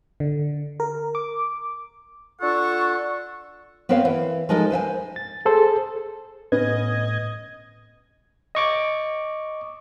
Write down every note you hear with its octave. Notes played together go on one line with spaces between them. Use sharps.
D3
A#4
D6
D4 F4 A4 F#5 C#6
B3 C4 A#4 C5 C#5 F5
E3
F3 G#3 D#4 A4 A#4 D#5
B4 C5 E5 G#5
A6
G#4 A4 C5
A2 B3 C#4 B4 D#5 G#6
D#5 C#6 D6